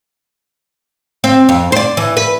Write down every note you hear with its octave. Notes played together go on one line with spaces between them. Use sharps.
C4
F2
C5 D5
E3
B4